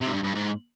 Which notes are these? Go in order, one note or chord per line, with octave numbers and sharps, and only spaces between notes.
C3
G#2
G2
G2
G#2